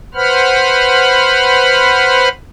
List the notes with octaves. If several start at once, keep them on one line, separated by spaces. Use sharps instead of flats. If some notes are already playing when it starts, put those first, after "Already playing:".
B4 C5 F#5 B5 F6